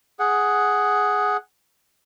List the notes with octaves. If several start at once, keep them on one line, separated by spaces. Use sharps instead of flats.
G#4 F#5